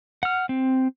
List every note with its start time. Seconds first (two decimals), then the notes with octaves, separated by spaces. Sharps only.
0.23 F#5 F6
0.49 C4